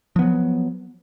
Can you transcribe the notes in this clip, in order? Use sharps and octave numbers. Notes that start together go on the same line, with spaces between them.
F3 F#3 B3